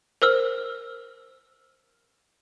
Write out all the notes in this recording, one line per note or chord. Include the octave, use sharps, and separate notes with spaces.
A#4 C5 E6 F6